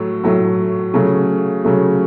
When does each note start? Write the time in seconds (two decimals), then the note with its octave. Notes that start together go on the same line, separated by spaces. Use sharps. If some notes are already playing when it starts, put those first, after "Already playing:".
Already playing: A2 F#3 A3
0.24 A2 F#3 A3
0.94 C#3 F#3 A3
1.64 C#3 F#3 A3